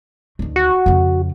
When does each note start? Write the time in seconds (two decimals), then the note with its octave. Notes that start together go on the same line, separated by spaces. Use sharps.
0.39 D2 D#3
0.56 F#4
0.86 F2 C#3